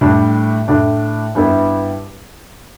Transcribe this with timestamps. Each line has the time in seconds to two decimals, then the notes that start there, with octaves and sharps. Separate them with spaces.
0.01 A2 G3 D4
0.68 A2 A3 D4
1.35 G2 G3 B3 E4